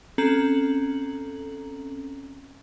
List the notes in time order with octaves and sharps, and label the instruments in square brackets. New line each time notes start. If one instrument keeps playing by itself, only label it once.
[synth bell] C4 C#4 A4 A#5 F#7